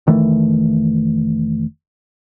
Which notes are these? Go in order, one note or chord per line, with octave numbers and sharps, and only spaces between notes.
F1 D#3 E3 A3